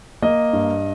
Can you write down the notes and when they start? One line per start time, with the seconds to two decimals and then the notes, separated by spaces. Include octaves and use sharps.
0.22 A#3 D#5
0.53 G2